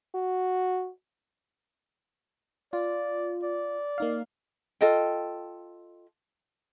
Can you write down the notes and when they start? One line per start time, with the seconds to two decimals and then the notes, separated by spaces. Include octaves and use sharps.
0.15 F#4
2.73 F4 D5
3.43 D5
3.98 A#3 D#4 F5
4.81 F4 A4 D#5 G5